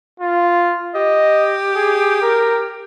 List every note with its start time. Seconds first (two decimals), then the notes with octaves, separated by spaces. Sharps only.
0.20 F4
0.95 G4 D#5
1.75 G#4
2.22 A#4